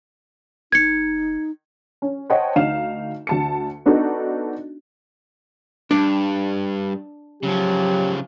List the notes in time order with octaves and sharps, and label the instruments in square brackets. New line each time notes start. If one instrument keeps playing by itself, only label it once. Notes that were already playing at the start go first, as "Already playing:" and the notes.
[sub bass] F1 [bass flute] D#4 [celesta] G#6 C#7
[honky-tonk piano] C#4
C5 C#5 D#5 F#5 G5 A5
D2 D#4 F5 E7
D2 A5 C#7
B3 D4 D#4 F#4 A4
[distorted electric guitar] G2 [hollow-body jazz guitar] D4
[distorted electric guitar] C#3 F3 [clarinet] F#3 [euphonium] G4